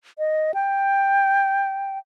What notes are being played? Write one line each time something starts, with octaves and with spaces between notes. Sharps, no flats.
D#5
G5